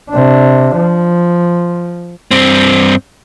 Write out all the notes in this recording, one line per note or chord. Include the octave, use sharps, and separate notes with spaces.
C3 D4
F3
G2 C4